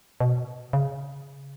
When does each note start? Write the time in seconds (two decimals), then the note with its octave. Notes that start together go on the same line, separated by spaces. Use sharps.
0.20 B2
0.73 C#3